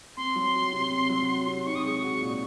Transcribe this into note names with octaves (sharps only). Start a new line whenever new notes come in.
C4 C6
F#3
F#4
C3
C4
F#3
F#4
C3
D#4 C#6
D#6
G#3 C#6
F#4
A#2